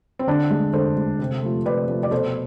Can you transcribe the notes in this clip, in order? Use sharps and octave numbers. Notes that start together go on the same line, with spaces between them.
C4
D3 D4
G#3
D3 A4 C5
G#3
C3
F3 A3
C3 B4 D5
F3 A3
D5
B2 A4 C5